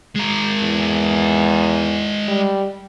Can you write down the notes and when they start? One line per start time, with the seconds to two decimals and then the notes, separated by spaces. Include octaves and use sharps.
0.16 G#3 A#4
0.61 E2
2.28 G3